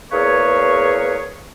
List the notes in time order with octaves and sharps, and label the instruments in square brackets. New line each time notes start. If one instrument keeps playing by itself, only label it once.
[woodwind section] E2 A#3 G#4 B4 C#5